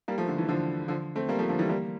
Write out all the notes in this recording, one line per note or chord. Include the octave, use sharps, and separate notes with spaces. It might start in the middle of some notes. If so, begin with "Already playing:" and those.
G3 A#3
F3 A3
D3
E3
D3 F3
D3 F3
A3 C4
G3 A#3
F3 A3
D3 F3
E3 G3
G3 A#3